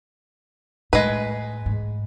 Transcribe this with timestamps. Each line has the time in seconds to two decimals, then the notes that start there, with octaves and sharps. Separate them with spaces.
0.93 A2 G#3 B4
1.66 G#2